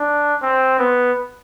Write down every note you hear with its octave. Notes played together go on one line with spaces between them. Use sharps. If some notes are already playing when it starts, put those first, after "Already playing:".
Already playing: D4
C4
B3